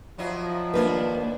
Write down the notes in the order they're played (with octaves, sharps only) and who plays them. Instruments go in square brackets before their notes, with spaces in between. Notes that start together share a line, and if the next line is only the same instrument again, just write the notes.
[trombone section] F3 [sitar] F#3 E4 D#5
[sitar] D#2 D4 E4 [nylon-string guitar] A#3 B4